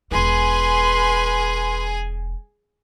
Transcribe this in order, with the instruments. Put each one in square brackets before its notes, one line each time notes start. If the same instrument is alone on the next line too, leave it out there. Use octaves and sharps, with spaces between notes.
[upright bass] E1 E4 [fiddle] G#4 G#5 [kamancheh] B4 C6